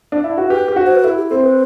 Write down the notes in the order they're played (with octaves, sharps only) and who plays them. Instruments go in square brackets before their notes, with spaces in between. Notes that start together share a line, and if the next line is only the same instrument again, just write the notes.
[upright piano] D4
E4
F#4
[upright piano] G4 [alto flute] B4
[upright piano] G4
F#4
[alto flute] C5
B4
[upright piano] E4 [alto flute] A4
[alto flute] G4
[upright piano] C4 [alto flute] A4
[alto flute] B4